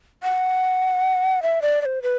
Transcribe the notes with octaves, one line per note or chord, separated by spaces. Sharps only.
F#5
E5
D5
D5
C5
B4